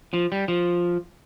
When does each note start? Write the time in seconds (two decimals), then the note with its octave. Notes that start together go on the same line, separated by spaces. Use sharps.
0.13 F3
0.32 G3
0.48 F3